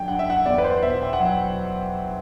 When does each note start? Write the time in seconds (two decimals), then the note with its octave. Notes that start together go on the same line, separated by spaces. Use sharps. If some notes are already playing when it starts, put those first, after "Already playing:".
Already playing: D3 F#3 G5
0.08 G2 F#5
0.19 E5
0.30 F#5
0.46 E2 D5
0.58 B4
0.64 C5
0.83 B2 E5
1.02 G5
1.13 F#5
1.19 F#3
1.25 G5